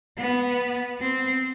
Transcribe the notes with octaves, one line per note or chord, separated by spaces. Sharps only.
B3
C4